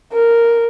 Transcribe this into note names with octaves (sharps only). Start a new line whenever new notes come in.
A#4